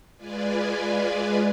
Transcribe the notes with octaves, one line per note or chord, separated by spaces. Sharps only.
G#3 F4 B4 D5 G#5